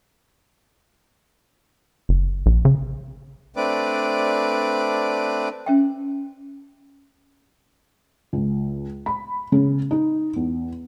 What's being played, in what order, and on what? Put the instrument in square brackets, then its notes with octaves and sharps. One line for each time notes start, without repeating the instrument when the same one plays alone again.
[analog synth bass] F#1
A#1
C#3
[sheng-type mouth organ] A3 C4 D4 B4 D5 D6
[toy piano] C#4 E5 G5
[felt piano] C#2
B5
C#3
D#4
E2